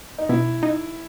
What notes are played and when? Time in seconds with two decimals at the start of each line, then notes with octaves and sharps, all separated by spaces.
0.18 D#4
0.29 B2 E4
0.63 D#4